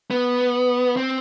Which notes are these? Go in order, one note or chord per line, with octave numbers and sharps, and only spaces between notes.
B3
C4